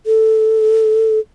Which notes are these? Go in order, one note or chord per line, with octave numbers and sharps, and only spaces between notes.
A4